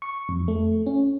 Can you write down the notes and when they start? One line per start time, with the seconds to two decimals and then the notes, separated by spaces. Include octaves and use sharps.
0.02 C#6
0.29 F2
0.48 A3
0.86 C#4